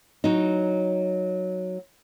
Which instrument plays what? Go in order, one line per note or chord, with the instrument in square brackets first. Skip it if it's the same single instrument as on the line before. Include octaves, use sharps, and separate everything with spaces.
[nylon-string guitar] F#3 D#4